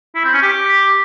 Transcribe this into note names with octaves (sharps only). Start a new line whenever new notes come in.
E4
C4
C#4
G4